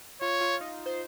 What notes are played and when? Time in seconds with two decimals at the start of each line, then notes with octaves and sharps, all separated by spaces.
0.21 F4 C#5
0.41 F4
0.61 D#4
0.86 C5